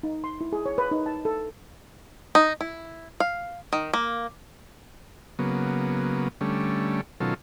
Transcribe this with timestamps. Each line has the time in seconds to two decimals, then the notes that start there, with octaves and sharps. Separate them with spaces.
0.03 D#4
0.24 C6
0.41 E4
0.53 G#4
0.66 C#5
0.78 B4
0.91 D#4
1.06 A5
1.25 A4
2.35 D#4
2.61 E4
3.20 F5
3.73 D#3
3.93 A#3
5.39 C#3 F#3 A#3 B3
6.41 D3 G3 A3 C#4
7.20 B2 D#3 F#3 C#4 F4 A4